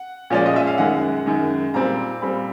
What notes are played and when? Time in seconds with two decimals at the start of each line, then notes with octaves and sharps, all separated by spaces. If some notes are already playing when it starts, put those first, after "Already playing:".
Already playing: F#5
0.30 A#2 F3 G#3 C#4 D5
0.46 D#5
0.56 E5
0.67 F5
0.78 F#2 D#3 G#3 F#5
1.26 F#2 D#3 G#3
1.74 A#2 G3 C4 A#5
2.22 A#2 G3 C4 B5